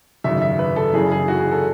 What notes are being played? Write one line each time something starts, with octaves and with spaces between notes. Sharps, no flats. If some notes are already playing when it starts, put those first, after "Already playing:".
G#1 F#2 C#3 E5
E5
B4
A4
F#1 F#2 C#3 E3 G#4
G#4
F#4
G#4
A4